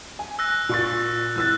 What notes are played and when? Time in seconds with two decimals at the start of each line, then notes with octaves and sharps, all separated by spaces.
0.19 G#5
0.39 E6 F#6 A#6
0.69 A#2 C#6 A6
1.36 E3 E6 F#6 A6